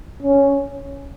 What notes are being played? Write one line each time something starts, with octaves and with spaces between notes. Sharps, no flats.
C#4